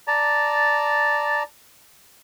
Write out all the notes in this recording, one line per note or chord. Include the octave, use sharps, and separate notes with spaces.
D5 A5 A#5